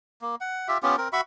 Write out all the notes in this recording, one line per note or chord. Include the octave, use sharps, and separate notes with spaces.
A#3
F#5
F4 G4 E5
B3 C#4 F4 G4
C4 A#4
F#4 E5 B5 C#6